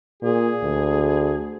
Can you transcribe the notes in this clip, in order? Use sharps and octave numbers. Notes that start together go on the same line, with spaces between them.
A#2 G#4
D2